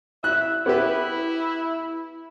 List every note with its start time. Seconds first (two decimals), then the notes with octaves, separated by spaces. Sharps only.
0.24 E4 E5 F#6
0.66 B3 E4 G4 B4